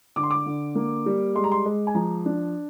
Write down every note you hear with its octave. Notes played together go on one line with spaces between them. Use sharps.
D3 D6
C6
D6
D3
A#3
G3
G#3 C6
A#5
C6
G#3
G#5
F3 A#5
D4